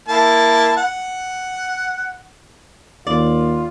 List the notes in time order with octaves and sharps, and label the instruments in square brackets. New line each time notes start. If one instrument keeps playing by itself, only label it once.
[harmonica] A#3 E4 A5
F#5
[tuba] D#2 [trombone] F4 [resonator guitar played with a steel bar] D5